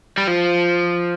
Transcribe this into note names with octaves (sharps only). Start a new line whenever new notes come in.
G3
F3